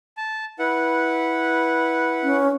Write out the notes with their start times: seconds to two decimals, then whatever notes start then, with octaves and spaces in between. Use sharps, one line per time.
0.17 A5
0.59 E4 B4 F#5
2.23 C#4